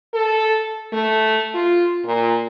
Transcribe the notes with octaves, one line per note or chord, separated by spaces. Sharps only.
A4
A3
F4
A#2